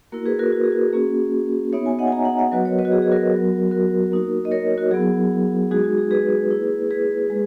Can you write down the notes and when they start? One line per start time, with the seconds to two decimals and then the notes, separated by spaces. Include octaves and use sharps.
0.12 A#3 E4 F#4 A#4
0.26 G#4 B4
0.39 F#4 A#4
0.52 F#4 A#4
0.64 G#4
0.72 F#4
0.93 A#3 C#4 F#4 G#4
1.73 B3 D#4 F#4 C#5 E5
1.85 E5 G#5
1.99 D#5 F#5
2.07 G#5
2.12 F#5 A#5
2.25 F#5 A#5
2.39 D#5 F#5
2.52 F#3 B3 F#4 B4 D#5
2.65 A#4 C#5
2.78 B4 D#5
2.85 F#4
2.92 G#4
3.02 G#4
3.12 F#4 A#4
3.32 F#3 B3 F#4
3.71 F#4 A#4
4.12 A#3 D#4 F#4
4.45 D#5
4.51 A#4 C#5
4.78 F#4 A#4
4.91 F#3 B3 E4 G#4
5.71 G#3 D#4 F#4 G#4
5.84 F#4
5.98 G#4
6.11 G#4 B4
6.51 A#3 E4
6.91 G#4 B4
7.30 G#3